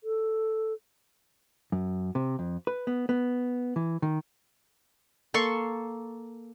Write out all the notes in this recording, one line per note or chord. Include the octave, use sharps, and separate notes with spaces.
A4
F#2
C3
F2
B4
B3
B3
E3
D#3
A#3 A4 C6 C#6